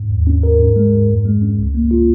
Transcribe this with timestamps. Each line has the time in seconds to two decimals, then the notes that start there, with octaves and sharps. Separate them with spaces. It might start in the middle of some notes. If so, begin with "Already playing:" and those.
Already playing: G#2
0.10 D#2
0.27 C#4
0.43 A#4
0.60 G#2
0.76 G#3
0.93 G#2
1.09 F2
1.25 G#3
1.42 C#4
1.58 C#2
1.74 A#3
1.91 F4